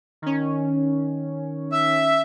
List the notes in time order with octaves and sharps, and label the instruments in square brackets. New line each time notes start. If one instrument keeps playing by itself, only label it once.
[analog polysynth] D#3 C#4
[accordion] E5